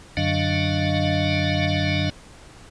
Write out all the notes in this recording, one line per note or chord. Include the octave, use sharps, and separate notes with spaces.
F#2 D3 F#3 D4 D#5 F5